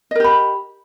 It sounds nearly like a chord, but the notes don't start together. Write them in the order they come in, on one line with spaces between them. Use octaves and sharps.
D#5 A#4 G4 B5